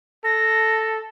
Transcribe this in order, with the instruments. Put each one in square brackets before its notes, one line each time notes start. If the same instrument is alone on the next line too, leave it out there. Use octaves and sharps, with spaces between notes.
[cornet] A4 [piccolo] A#6